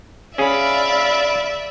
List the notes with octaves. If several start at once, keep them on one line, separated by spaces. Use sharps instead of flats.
C#4 G#4 D5 E5 F5 B5